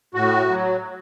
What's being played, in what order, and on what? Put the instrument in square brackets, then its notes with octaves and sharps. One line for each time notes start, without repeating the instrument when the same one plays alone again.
[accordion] A2 F#4
F#3